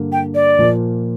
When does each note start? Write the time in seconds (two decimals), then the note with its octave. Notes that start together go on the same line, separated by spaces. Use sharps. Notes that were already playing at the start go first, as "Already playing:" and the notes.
Already playing: G2 D3 A#3
0.12 G5
0.35 D5
0.59 A#2 F3 A#3